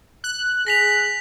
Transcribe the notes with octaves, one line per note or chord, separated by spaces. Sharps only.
F#6
G#4 A#6 B6 F7